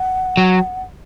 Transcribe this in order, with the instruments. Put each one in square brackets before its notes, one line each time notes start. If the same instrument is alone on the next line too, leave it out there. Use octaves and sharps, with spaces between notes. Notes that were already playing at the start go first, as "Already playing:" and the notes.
Already playing: [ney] F#5
[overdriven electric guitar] F#3